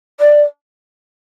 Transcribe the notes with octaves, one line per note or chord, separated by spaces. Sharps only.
D5